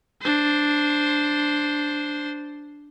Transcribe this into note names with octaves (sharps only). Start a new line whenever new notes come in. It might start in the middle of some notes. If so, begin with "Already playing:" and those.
D4 C5